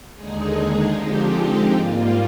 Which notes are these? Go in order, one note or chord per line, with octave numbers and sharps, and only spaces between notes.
D#2 D3 G#3 D#4 G#4
D3 F3 G#3 C4 D#4 G4
G#2 G3 A#3 F4